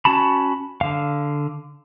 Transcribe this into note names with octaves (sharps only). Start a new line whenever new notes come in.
C#4 F#4 A5 B5
D3 F5